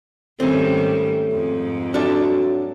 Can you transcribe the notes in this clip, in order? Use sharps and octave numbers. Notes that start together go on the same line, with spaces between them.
G#2 D#3 G3 A3 C4 C#4
F2 G#2
F#3 D4 A4 E5